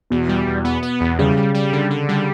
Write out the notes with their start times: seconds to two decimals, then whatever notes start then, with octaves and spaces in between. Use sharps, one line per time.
0.10 E2 B2
0.29 G3
0.47 E2
0.65 B3
0.83 B3
1.01 E2
1.19 C#3 G3
1.37 G3
1.54 G3
1.73 D3
1.90 D3
2.09 G3